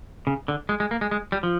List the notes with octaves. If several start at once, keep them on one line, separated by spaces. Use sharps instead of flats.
C#3
D3
G#3
G#3
A#3
G#3
G#3
G3
F3